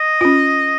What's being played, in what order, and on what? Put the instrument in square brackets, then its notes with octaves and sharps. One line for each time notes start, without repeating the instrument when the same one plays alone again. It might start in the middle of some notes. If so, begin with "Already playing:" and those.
Already playing: [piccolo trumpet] D#5
[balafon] C#4 F4